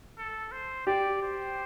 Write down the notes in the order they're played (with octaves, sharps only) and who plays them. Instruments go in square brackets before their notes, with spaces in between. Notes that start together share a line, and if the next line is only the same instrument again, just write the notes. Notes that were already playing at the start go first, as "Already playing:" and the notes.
[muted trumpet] A4
C5
[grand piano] G4 [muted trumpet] D5
[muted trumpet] C5